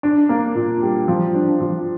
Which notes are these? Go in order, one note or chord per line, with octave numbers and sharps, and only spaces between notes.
D4
A#3
A#2
G3
F3
D4
F3